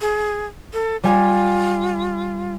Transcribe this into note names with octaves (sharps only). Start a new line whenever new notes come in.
G#4
A4
G3 F4 G#5